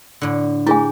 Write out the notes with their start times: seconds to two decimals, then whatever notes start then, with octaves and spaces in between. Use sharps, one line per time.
0.21 A2 D3
0.67 E4 G4 G#4 G#5